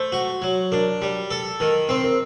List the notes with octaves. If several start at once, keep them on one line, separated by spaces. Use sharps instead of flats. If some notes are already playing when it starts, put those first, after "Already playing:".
Already playing: A3 C5
F#4
F#3
D4 A#4
G3
A4
D#3
C4 C5
A#4